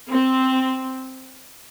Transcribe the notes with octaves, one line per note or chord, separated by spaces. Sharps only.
C4